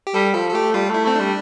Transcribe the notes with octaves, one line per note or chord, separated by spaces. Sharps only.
G4
G3 A4
F3 A4
A4
A3 G4
G3 F4
A3 E4
A3 C4
G3 D4